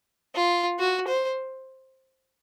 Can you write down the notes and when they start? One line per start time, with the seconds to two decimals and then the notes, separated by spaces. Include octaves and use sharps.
0.35 F4
0.79 F#4
1.08 C5